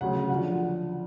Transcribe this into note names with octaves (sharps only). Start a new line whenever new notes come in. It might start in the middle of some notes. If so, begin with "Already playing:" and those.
D2 C#3 F#3 F#5
F#5
D3 F3 F#5